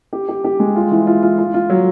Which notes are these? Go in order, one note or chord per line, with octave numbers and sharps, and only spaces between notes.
G4
G4
G4
G#3
F4
E3
F4
F4
F4
F4
F#3